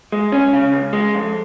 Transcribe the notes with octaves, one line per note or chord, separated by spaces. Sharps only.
G#3
C#4
C#3
C#2
G#3
F2